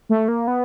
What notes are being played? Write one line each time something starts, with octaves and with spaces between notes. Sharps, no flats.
A3
A#3
B3